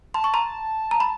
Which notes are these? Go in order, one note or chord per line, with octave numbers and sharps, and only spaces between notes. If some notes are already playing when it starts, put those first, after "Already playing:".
A5 C6
C#6
A#5 C6
A#5
B5